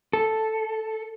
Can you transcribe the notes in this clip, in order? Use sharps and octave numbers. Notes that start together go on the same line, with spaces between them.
A4